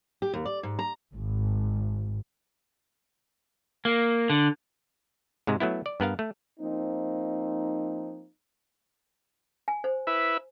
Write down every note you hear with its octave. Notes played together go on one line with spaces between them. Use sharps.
G4
D#2
D5
G#2
A#5
G#1
A#3
D3
G#2 C3 G#3
F#3 A3 B3 E4
D5
G2 B3 A#4 F5
A3
F3 A#3 C4 D#4
G#5
C5
E4 B4 E5